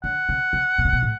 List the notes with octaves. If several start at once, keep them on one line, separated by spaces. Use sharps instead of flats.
D3 F#5
C#3
C#3
B2
C#3
B2
A2